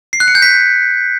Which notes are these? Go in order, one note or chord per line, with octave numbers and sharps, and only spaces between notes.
C7
F#6
C#7
G6
B6